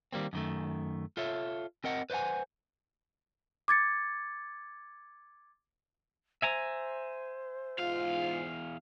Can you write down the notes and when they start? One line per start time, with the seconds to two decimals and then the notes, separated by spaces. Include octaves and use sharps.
0.13 D#3 G3 A#3 C4
0.33 F#2 D#3 A3
1.17 F4 A4 C#5 E5
1.84 C4 A#4 D#5 F#5
2.10 B4 C5 D5 F#5 G#5
3.68 D6 G#6 A6 C#7
6.42 C5 E5 G#5 A#5
7.79 E2 G#2 F4 F5